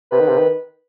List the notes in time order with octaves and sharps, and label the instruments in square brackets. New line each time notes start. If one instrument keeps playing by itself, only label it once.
[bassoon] C3 [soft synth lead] B4
[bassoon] D#3
C3
D#3